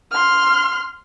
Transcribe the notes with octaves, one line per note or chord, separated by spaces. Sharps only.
C6 F6